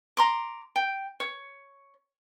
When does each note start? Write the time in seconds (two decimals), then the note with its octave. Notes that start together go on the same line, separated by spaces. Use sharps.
0.17 A#5 C6 D6
0.76 G5
1.20 C#5